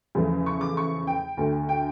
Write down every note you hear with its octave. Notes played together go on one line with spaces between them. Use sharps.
E2 C#3 F3 A3
C#6
D6
C#6
G5
D2 D3 A3
G5